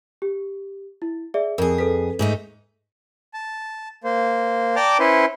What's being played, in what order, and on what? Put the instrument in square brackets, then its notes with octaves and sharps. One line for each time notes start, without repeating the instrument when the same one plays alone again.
[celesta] G4
E4
G#4 D5 E5
[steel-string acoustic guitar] F2 G#4 [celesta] A#4
[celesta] A4 B4 B6
[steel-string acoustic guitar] G#2 A3 D#4
[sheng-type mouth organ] A5
A#3 C5
D5 G5 A5 A#5 D6
C#4 E4 B4 C5